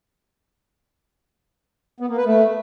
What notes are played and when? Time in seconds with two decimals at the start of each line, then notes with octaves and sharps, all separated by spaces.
2.00 B3
2.09 A#3
2.17 B4
2.26 A3